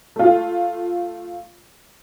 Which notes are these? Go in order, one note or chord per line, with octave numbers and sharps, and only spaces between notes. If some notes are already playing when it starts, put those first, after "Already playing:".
A3 F4